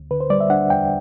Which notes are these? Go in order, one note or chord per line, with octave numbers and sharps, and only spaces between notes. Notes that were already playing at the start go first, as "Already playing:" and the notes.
Already playing: D2
D3 B4
C5
G3 D5
E5
D4 F#5
E2 G5